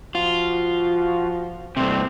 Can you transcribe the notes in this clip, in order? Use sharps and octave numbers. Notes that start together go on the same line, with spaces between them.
F3 F4 F#4
G2 C3 A3 C4